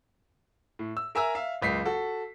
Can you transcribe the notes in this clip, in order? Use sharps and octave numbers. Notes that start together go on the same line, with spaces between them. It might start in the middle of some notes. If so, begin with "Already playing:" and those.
A2
E6
A#4 E5 G#5 A#5 E6
E5 F5
F#1 C#2 B6 C7
F#4 A4